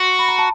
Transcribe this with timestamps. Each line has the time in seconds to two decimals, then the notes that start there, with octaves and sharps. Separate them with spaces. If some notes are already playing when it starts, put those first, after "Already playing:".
Already playing: F#4 C6
0.19 B5
0.28 A#5
0.38 A5